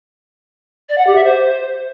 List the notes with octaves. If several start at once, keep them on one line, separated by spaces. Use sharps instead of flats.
D5
F#5
G4
E5
C5